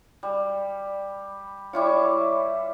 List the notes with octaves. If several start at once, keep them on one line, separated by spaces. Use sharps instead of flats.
G3
G3 E4 F4 C#5 C#6 D6